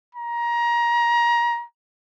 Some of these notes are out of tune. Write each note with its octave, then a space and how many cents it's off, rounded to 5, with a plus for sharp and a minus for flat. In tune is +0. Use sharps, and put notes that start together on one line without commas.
A#5 +25